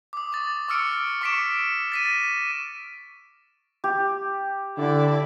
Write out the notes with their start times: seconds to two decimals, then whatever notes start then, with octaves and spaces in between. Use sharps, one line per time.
0.13 D6 D#6
0.32 C#6 D6 A6
0.68 C#6 D6 E6 F6 C#7 D7
1.21 C#6 D6 B6 C#7 D7 E7
1.92 A6 B6 D#7
2.11 A#6
3.84 G4
4.78 D3 E4 D5